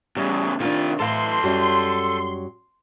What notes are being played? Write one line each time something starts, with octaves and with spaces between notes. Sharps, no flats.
E2 C#3 G3
C3 D#3 D4 F4
A2 E3 A4 F5 C6
F#2 F#3 G3